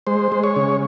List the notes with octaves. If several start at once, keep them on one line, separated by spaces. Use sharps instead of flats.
G#3 C5
G#3
C#5
C#3